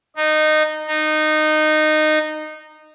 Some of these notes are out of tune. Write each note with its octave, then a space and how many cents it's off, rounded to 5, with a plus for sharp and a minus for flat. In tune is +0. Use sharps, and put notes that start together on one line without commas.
D#4 -15
D#4 -15